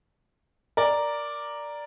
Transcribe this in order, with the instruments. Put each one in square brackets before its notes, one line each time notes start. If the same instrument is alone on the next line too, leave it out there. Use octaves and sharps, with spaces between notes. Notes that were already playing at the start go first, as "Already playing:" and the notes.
[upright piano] A#4 D5